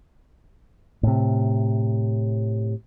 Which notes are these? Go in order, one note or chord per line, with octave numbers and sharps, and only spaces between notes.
A2 C3